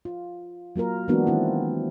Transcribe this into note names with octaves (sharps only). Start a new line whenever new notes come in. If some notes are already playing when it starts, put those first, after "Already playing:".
F4
F#3 A#3 F4 A#4
E3 G#3 A#3 B3 D4 F#4
D#3 A#3 C4 E4